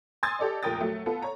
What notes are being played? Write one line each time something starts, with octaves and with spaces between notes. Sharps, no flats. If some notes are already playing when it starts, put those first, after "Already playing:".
G#5 C6 D#6 E6 G#6 A6
G4 A4 D5 D#5
F1 A#2 A#4 G5 D#6 A6
F#3 A3
B3 F4 A4
C#5 A#5